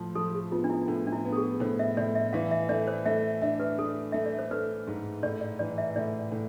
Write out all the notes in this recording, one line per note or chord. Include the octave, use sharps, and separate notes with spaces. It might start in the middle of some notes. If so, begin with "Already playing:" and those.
Already playing: A2 F3
F3 A4
G#4
B3 F4
D4
E4
A2 D4
D4
E4
B3
A4
G#4
A2 C5
E5
A2 D5
E5
E3 F5
E5
A3 D5
C5
A3 E5
D4 E5
B4
A3 A4
A3 E5
D5
C5
A3 B4
G#2
A2 D5
D5
E3 D5
E5
A2 D5
A2